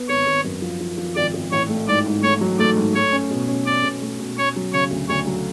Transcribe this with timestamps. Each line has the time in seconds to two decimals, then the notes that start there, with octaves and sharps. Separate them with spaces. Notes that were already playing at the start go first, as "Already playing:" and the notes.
Already playing: B3
0.08 G#1 C#5
0.27 G#1
0.44 F#2
0.62 F3
0.80 F3
0.98 F3
1.15 G#1 D5
1.34 G#1
1.52 A1 C#5
1.69 A3
1.88 G#2 D5
2.06 G#2
2.23 A3 C#5
2.41 F#3
2.59 A3 D5
2.77 G#2
2.95 A3 C#5
3.12 C#4
3.30 B2
3.48 C#4
3.66 C#4 D5
3.84 B2
4.02 A3
4.19 B2
4.38 C#4 C#5
4.56 F#3
4.73 C#3 C#5
4.91 D2
5.09 D2 C#5
5.27 F#3